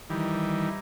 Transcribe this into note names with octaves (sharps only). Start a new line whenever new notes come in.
D#3 E3 G3